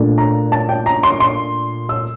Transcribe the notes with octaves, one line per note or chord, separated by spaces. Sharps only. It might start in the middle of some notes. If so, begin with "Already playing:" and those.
Already playing: A#2 A3 D4
A#5
A5
G5
A#5
C6
C6
E6